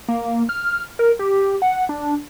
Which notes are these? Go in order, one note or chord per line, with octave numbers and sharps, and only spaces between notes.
A#3
F6
A#4
G4
F#5
D4